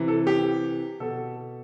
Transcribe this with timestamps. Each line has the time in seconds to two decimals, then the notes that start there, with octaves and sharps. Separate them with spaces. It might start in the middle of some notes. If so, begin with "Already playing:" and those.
Already playing: C3 E3
0.08 A4
0.27 G4
1.00 B2 A4